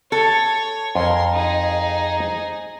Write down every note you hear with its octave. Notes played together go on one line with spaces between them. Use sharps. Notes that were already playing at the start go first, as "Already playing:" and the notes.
A4 C#5
F2 A#4 C#5 G#5 C6
D#4 G#4